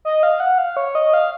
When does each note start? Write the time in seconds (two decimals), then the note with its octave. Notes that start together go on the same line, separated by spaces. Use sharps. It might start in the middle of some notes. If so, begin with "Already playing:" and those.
0.05 D#5
0.23 F5
0.40 F#5
0.58 F5
0.77 C#5
0.95 D#5
1.14 F5